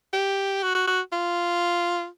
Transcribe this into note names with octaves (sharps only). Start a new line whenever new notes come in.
G4
F#4
F#4
F#4
F4